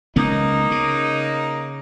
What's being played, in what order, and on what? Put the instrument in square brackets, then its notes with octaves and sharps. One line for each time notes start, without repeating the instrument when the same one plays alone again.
[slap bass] C#2 C#3 B3 [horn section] A#3 D#4
[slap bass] C#3